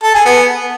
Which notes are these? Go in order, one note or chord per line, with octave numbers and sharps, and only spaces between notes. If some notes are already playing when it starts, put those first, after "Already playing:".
A4
G#4
B3